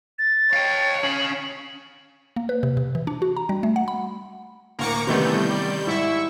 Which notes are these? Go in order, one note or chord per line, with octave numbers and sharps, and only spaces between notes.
A6
C#5 F5 G5
C#4 F5 F#7
A#3
B4
C3
C3
E3
D4
F#4
A#5
G3
A3
F#5
B5
D2 A2 A#3 A#5 C#6 D6 C#7
C3 D#3 E3 G3 A3 B3 C#4 G6
D5
G#2 E4 E5 C#6